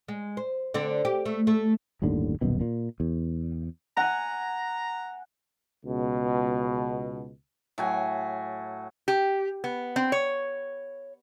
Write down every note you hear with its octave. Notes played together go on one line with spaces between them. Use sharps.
G#3
C5
D3 C4 D4
G4
A3
A3
G1 D#2 A2 D3
D#1 B1 F#2 B2
A#2
E2
F#5 G#5 A#5
C#2 B2
A2 F#3 G#5
G4
B3
C4
C#5